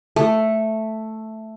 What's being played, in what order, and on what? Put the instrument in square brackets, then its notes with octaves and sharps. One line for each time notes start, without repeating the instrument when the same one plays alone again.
[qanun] A3